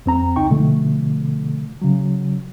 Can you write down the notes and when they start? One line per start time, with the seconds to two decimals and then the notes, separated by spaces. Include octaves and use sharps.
0.06 F2 C4 A#5
0.36 C#2 D#4 G5 C#6
0.50 B2 D3 F3 A3
1.82 C#3 F#3